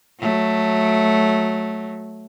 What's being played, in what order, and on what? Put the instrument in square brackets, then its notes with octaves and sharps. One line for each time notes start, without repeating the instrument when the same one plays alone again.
[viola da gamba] F#3 A3